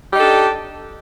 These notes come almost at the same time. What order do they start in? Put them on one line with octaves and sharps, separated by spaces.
G4 D#4 A4 D4